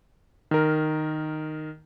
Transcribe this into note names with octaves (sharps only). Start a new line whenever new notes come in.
D#3 A#4